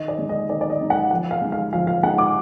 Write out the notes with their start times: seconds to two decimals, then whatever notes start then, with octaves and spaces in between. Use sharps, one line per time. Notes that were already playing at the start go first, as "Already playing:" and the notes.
Already playing: D#3 D#5
0.08 D5
0.18 G#3 D#4
0.29 D#5
0.49 D#3 D5
0.61 D5
0.70 D#5
0.80 G#3 D#4
0.90 F#5
1.11 F3 F#5
1.31 F5
1.42 G#3 D#4
1.52 F5
1.73 F3 F5
1.87 F5
2.03 G#3 D#4 F#5
2.18 D6